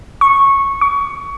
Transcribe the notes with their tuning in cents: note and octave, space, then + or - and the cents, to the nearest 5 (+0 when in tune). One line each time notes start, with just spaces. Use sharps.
C#6 -10
C#6 +20